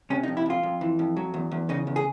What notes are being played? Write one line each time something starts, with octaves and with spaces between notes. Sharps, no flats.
C3 C#4
D#4
F2
E4
F2 F4
F2
E3
F2
F#3
E2
E2
C#3 D#4
E2
G#4